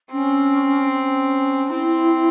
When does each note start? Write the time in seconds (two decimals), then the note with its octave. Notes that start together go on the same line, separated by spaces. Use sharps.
0.12 C4 C#4
0.91 C#4
1.70 C4 E4